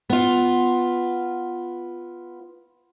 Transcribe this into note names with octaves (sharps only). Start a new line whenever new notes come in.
B3 F4